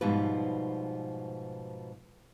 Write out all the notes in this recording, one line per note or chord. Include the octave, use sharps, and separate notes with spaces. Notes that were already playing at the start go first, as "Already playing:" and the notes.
G#2 B2 F3 G3 B4